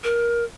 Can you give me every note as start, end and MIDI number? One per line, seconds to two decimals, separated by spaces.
0.04 0.44 70